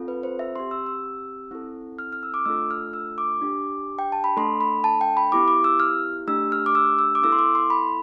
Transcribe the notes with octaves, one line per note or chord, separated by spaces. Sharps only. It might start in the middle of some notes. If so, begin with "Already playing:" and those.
Already playing: C4 F4 A4
B4
C5
E5
C4 G4 C6
E6
E6
C4 E4 A4
F6
F6
E6
D6
A3 D4 F4 A4 E6
F6
E6
D6
D4 G4
G5
A5
B5
A3 D4 A4 C6
B5
A5
G5
B5
B3 E4 G4 D6
D6
E6
F6
A3 D4 G4 E6
F6
D6
E6
E6
D6
B3 E4 A4 E6
C6
D6
C6
B5